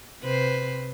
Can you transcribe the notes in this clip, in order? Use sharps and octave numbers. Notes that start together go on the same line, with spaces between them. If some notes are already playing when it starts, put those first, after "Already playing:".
C3 B4 C5